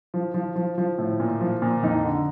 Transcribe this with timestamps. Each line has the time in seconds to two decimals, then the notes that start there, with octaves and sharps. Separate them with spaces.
0.14 F3
0.34 F3
0.56 F3
0.78 F3
0.98 A2
1.20 A#2
1.41 F3
1.62 A#2
1.83 F2 D#4
2.04 D3